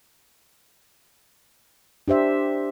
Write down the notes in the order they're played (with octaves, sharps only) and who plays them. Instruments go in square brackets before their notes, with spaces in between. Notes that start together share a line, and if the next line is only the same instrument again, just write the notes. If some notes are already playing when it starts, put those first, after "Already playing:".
[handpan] D4 G4 C5 E5